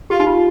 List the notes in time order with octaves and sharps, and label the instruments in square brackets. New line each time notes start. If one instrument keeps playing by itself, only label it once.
[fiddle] F4 [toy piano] G4
[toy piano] D#4
F4